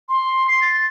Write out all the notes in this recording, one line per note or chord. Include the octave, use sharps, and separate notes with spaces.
C6
C7
A6